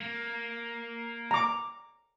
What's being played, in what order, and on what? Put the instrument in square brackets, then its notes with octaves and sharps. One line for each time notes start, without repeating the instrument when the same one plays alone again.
[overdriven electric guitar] A#3
[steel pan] A#5 D6